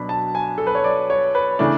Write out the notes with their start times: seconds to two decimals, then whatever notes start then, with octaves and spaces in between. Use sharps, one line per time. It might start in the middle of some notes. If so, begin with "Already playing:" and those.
Already playing: B2 F#3 B3 D4 B5
0.09 A5
0.35 G#5
0.58 A4
0.67 B4
0.75 C#5
0.84 D5
1.10 C#5
1.35 B4
1.59 C#3 E3 A3 D4